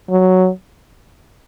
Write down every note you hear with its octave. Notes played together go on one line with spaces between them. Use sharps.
F#3